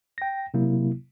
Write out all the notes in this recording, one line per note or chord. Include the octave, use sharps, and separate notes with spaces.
G5 A#6
C3 F#3 A#3 E4